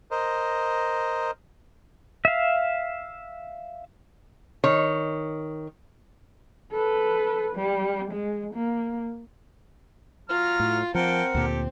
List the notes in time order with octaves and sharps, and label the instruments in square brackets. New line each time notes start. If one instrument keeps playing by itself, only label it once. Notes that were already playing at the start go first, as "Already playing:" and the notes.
[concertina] A#4 C5 D#5
[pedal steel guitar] E5 F5
[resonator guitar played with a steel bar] D#3 C#5
[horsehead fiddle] A4 B4
G3
G#3
A#3
[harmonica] F#3 A#5 F6 [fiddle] F4
[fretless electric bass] A2
[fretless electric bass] F3 [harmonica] A#3 G5 A5 [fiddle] C4 [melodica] A#4 F#5
[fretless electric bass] D2 A#2 [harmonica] G4 A4